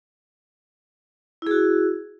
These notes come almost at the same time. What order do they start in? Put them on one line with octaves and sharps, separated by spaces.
E4 G#4 F#4